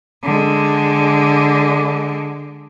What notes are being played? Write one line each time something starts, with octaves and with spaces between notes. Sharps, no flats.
D3 G#3